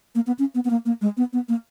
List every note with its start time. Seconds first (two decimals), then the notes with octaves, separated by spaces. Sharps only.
0.15 A#3
0.27 B3
0.39 C#4
0.55 B3
0.65 B3
0.70 A#3
0.85 A#3
1.01 G#3
1.17 B3
1.33 B3
1.49 A#3